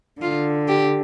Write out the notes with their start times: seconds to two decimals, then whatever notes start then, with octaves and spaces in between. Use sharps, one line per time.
0.22 D3 F4
0.68 G4